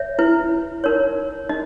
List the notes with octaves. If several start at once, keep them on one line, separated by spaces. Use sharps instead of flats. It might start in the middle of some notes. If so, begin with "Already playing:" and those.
Already playing: C#5 E5
E4 B4
D#4 A#4 C#5
D#4 D#5